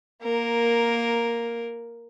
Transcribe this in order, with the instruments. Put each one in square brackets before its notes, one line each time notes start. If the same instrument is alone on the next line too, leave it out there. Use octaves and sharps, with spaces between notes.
[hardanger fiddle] A#3 A#4